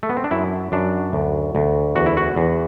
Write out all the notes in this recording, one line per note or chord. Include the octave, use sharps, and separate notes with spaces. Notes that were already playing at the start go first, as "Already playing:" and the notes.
A3
B3
C4
D4
F#2 E4
F#2 D4
D2
D2
E2 F#4
E4
F#4
E2